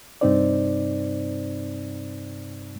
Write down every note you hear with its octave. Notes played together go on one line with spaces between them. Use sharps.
G2 C3 C4 D#4 C5 D5